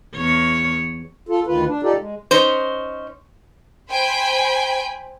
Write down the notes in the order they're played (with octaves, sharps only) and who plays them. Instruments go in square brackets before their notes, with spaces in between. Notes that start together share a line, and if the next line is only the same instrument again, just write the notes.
[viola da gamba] E2 C#5
[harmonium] F4 A4
D2 D#3 F4 B4
D4
D#4 F4 G4 A4 D5
G#3
[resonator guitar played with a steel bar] C#4 D#4 C5
[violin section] C5 G5 G#5 B5